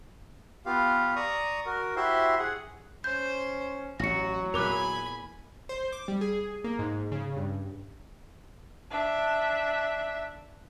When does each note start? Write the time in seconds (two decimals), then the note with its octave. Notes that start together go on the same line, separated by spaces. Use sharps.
0.66 B3 F4 G4 F5
1.16 D5 A#5 C#6 D#6
1.66 F#4 A#4
1.96 E4 F#4 G4 C5 E5 C6
2.39 G#4 F#5
3.04 C#4 C5 G6
4.00 A1 F#3 F#4 A#6 C#7
4.54 E2 A#2 A#4 G#5 B5 D6 F#6
5.69 C5
5.92 D6
6.08 G3
6.21 G#4
6.64 A#3
6.79 G#2
7.12 C#3
7.37 G2
8.91 D4 E5